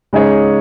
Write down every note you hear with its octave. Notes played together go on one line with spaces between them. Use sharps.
C#3 G#3 D#4 G#4 C#5